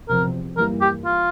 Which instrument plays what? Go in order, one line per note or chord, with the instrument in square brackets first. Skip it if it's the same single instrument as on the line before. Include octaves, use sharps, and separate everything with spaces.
[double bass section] E2 C3 F3 C4 [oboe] A#4
[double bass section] G2 E3 G3 A#3 [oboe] A#4
[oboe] G4
F4